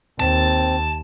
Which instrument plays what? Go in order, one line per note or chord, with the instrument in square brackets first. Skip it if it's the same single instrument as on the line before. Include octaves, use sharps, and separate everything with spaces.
[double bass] D#2 [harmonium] C4 [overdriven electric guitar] A5